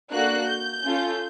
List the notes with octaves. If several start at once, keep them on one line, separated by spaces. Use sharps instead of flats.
A#3 D4 F#4 A4 F#6
G6
C#4 F4 A4